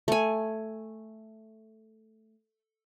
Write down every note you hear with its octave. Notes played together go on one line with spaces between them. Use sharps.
A3 G#5